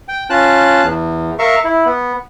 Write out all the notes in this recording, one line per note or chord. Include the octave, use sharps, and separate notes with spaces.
G5
C#4 F4 A5 F#6
E2
A#4 E5 F5 C#6
E4
B3